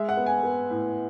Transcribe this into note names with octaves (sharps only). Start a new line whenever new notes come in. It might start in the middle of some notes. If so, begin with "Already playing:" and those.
Already playing: G#3 E5
F#5
B3
G#5
B3
A2